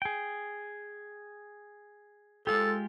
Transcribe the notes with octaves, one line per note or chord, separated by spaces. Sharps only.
G#4 G5
G#3 F4 G4 A4